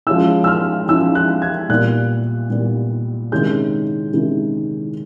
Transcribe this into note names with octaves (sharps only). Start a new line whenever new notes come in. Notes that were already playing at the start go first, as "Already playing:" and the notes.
F3 G#3 C#4 E4 E6
E6
F6
F3 G#3 C#4 E4 E6
F#6
G#6
A#2 G3 B3 F#6
A#2 G3 B3
C3 D#3 G#3 C#4 E4 G6
C3 D#3 G#3 C#4 E4